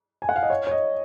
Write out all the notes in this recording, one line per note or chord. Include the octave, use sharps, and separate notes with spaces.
G#5
F#5
F5
D#5
C#5
C#5
D#5